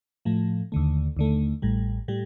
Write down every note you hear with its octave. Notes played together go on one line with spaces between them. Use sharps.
A2 F3 A3
D#2 D3 A3
D#2 D3 A3
A1 A2 G3
A2 G3